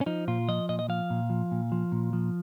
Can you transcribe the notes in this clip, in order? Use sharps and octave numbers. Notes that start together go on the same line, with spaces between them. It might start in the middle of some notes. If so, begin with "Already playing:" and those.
C#4
F3 D#4
A#2 F4
F3 D#5
A#2 D#5
D#5
F3 F5
A#2
F3
A#2
F3
A#2
F3